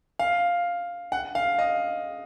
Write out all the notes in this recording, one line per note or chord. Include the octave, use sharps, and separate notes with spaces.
F5
F#5
F5
D#5